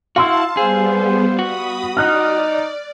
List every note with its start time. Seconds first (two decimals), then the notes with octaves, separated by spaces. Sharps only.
0.16 E4 F#4 F5 A5 C6 E6
0.57 G3 B3 G#4 C5
1.39 F#4 B5 D#6
1.97 D#4 D5 F6 F#6